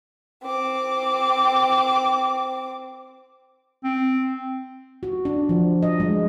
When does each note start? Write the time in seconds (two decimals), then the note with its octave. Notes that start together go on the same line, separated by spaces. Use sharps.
0.43 C4 D6
3.84 C4
5.03 F#4
5.25 D4
5.49 F3
5.83 D#5
6.00 G#3